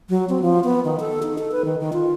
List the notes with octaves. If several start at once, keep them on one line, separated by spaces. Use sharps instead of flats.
F#3
C4
F3
B3
D#3
A4
D#4
A4
B4
D#3
D#3
F4